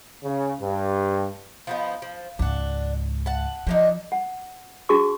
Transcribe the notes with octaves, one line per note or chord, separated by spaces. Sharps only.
C#3
G2
F3 B3 D#4
F3
C#2 G#2 D4 F#5
F#5 A5
D3 F3 D4 D#4
F#5
D4 F#4 G#4 A5 C#6 D6